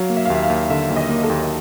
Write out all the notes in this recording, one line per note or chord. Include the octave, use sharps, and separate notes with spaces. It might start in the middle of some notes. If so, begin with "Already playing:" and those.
Already playing: F#3 F5
A#3
E5
F5
D#2 E5
F5
D#2
D3 E5
D#2
D#5
A#3
A4
D#2